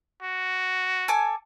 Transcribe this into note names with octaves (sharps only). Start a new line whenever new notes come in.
F#4
A4 G#5 D6